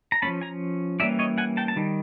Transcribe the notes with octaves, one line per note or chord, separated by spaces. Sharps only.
A#5
F3 A#3 C#4 A5 B5
G#5 A#5
E3 G3 A#3 C#4 D5 E5
C#5 D#5
F#5 G#5
G5 A5
A5
D#3 G3